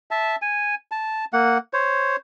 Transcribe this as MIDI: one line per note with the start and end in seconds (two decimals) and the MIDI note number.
0.11 0.36 76
0.11 0.36 81
0.42 0.75 80
0.91 1.25 81
1.33 1.58 58
1.33 1.58 78
1.73 2.16 72
1.73 2.16 73